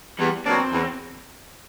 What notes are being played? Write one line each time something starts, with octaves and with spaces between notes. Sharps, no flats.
E2 G3
B2 F#3 A#3 C4 D4
E2